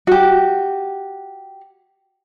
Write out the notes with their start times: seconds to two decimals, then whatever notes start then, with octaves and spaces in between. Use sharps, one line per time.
0.07 F#4 G4